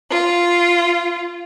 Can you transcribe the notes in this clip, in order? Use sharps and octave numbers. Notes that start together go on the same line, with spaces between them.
F4